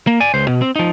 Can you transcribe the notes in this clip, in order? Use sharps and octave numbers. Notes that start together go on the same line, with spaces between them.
A#3
D5 G#5
C#2 C5
B2
C4
F3 D#4